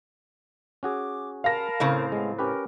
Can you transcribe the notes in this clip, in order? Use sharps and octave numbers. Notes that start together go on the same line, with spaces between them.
C#4 F#4 G#4 D6
A#4 F5 A5 B5 A#6
A2 C#3 C4
G#3 B3
C#4 G4 A#4 B4